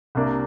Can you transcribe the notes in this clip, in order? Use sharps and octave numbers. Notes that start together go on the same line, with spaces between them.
C2 C3 A#3 D4